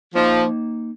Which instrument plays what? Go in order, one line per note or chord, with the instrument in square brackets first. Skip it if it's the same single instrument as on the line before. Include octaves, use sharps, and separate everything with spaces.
[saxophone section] F3 [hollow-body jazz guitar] A#3 D#4 C5 D#5